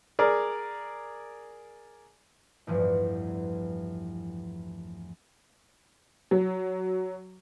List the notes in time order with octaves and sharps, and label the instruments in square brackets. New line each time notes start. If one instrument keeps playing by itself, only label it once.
[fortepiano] G#4 A#4 D5
[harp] A1 E2 G2 F3
[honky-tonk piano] F#3